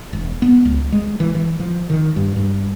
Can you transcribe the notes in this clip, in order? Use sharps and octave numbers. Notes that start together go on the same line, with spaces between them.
E1
B3
C#2
G#3
E3
E3
F3
D#3
G2
G2